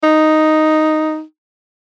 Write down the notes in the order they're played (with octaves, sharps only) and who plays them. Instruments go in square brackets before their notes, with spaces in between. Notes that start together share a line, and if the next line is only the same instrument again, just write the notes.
[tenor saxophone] D#4